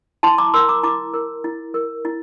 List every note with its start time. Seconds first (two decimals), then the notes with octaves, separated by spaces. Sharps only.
0.23 E4 A5 C6
0.38 A#5 D6
0.54 A#4 C6 E6
0.69 A#5 D6
0.83 E4 A#5 D6
1.14 A#4
1.44 E4
1.74 A#4
2.05 E4